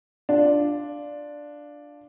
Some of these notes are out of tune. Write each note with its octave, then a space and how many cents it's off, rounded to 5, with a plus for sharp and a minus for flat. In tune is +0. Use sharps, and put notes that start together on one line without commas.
D4 +0 F4 +0